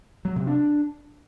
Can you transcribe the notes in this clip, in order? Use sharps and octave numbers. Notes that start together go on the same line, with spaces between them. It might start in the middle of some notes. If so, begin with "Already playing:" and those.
F#3
C3
D4